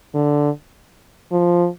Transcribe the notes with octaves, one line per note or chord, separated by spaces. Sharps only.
D3
F3